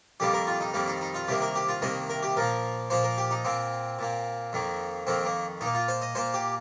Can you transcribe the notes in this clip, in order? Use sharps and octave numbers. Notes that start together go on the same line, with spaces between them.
F2 D#3 G3 A#3 G4
A#4
F4
D#4
F2 D#3 G3 A#3
D#4
D#4
F4
C2 C3 D#3 A#3 G4
A#4
G4
F4
C2 C3 D#3 A#3 D#5
A#4
G4
A#2 F3 A#3 A#4
A#2 F3 A#3 C5
A#4
G4
D#4
A#2 A#3 C4
A#2 A#3
F2 D#3 A#3
F2 D#3 A#3 C4
A#3
A#2 A#3 D#4
F4
C5
D#5
A#2 A#3 C5
G4